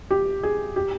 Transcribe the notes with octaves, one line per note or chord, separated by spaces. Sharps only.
G4
G#4
G4